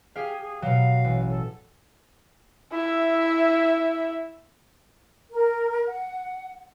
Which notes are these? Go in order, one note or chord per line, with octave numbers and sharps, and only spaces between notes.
G4 G#4 F5
G#4
B2 F#3 F5
A1
A4
E4 E5
A#4
F#5